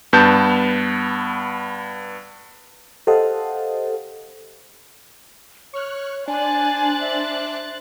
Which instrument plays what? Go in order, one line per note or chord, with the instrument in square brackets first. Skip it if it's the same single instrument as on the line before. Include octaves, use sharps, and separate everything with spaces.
[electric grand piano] G2 B3 A5 G6
[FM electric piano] G4 A4 C5 D#5 F5 F#5
[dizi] C#5 [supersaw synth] C#6 F6 F#6
[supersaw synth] D4 [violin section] C5 F#6 A6 [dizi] G#5
[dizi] E5